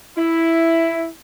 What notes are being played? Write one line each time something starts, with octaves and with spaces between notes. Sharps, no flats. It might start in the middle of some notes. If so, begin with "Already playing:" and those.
E4